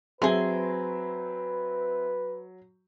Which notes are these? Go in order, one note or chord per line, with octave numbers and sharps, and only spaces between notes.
F#3 C4 G#4 B4 E5 C6